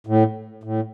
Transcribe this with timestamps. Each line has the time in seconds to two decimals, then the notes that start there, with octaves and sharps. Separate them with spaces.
0.07 A2
0.63 A2